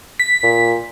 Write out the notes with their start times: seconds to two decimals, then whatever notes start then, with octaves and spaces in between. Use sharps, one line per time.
0.20 B6
0.43 A#2